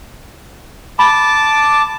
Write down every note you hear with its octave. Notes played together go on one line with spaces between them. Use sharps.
A5 B5 D6